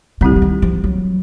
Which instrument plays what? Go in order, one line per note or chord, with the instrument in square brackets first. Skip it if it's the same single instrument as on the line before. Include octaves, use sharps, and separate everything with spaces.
[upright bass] C#3 [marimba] G3 C4 E4 G4
[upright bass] D3
D#3
F3
F#3